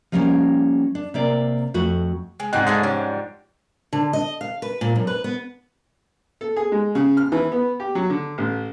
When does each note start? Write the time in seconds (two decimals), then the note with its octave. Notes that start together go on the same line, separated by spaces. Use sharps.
0.12 F3 G3 A#3 C4 C#4
0.95 D4
1.14 C3 A#3 D5
1.74 F2 A3 F#4
2.40 G#3
2.53 G#2 C4 D4 D#5 F#5 G#5 F#6
2.67 G#3 D4 G#4 A4 F5
2.83 F3 G3 C#4 D4
3.93 D3
4.13 D#5
4.41 F5
4.62 B4
4.81 A#2
4.96 F#2
5.07 B4
5.24 B3
6.41 A4
6.56 G#4
6.72 G#3
6.95 C#3
7.17 F6
7.32 E3
7.52 B3
7.80 G4
7.95 F#3
8.10 D3
8.38 A1